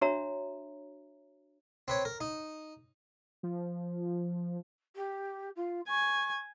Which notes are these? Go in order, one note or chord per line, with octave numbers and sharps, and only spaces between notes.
D4 F#4 C#5 E5 A#5
C4 B4 C#5
A#4
D#4
F3
G4
F4
G#5 C#6